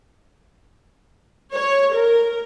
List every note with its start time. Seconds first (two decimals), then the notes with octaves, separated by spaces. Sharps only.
1.54 C#5
1.95 A#4